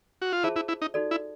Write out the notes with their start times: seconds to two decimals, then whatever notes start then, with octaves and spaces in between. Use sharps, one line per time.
0.22 F#4
0.32 F4
0.44 E4 F4 G#4 C5 E5 A5
0.56 E4
0.68 E4
0.82 D#4
0.94 D#4 F#4 A4 D5
1.11 E4